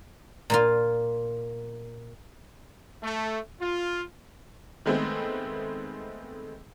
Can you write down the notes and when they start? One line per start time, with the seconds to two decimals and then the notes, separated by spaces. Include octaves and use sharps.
0.50 A#2 A#3 F4
3.03 A3
3.61 F4
4.86 D#3 G#3 A3 B3 C4